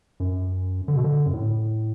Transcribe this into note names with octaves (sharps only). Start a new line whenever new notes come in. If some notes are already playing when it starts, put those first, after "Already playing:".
F#2
D3
B2
D3
F#2
A2